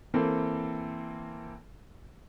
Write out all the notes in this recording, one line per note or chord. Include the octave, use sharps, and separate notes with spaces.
E3 A#3 C4 A4